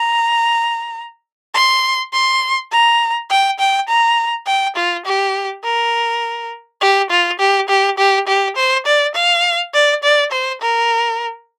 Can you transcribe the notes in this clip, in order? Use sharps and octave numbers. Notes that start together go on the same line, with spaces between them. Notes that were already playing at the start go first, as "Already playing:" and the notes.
Already playing: A#5
C6
C6
A#5
G5
G5
A#5
G5
F4
G4
A#4
G4
F4
G4
G4
G4
G4
C5
D5
F5
D5
D5
C5
A#4